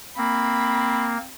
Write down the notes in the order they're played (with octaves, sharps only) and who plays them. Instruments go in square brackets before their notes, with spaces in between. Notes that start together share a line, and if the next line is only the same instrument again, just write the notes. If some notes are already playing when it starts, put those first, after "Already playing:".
[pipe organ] A#3 [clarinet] C4 [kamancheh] B5